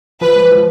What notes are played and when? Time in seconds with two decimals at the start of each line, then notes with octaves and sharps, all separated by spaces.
0.21 F3 B4
0.36 G#3
0.51 F3